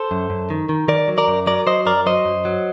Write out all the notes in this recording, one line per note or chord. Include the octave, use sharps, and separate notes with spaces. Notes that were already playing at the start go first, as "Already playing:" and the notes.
Already playing: A4 C5
F#2
F#2
D#3
D#3
D#3 A#4 D5
F#3
A#4 D5
F#2
F#3 A#4 D5
F#3 C5 D#5
F#2 A#4 D5
F#3 C5 D#5
F#2
F#3